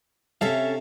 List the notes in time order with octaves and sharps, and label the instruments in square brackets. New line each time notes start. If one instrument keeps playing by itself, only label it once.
[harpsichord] C3 F5 A5 [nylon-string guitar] C#4 A4 E5